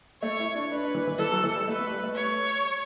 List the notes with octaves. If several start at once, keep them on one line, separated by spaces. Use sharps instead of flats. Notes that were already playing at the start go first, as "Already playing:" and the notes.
A3 C#5
E4
D4
D4 B4
D4
E3
E3
E3 A4
F#3
E3
G3
A3 B4
B3
G3
A3
C#5